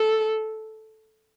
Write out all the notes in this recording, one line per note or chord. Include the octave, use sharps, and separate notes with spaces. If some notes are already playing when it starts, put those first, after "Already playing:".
Already playing: A4